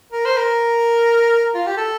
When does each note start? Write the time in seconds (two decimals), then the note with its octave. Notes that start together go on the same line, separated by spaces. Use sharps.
0.12 A#4
0.25 C5
0.37 A#4
1.54 F4
1.66 G4
1.77 A4